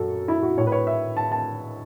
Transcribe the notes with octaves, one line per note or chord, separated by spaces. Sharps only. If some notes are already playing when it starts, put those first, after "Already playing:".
Already playing: F#2 F#4 A4
E4
F#4
A2 A3 C#5
B4
C#5
E5
A5
A5